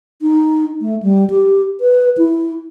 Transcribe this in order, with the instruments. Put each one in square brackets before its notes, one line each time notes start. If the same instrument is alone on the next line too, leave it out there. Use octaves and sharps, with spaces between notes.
[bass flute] D#4
A3
G3
G4
B4
E4